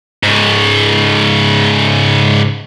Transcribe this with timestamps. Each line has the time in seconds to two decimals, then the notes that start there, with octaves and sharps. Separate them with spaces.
0.23 G#2 C#3